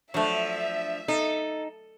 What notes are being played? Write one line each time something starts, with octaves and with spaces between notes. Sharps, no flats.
F3 F#3 A3 D4 E5
D#4 A4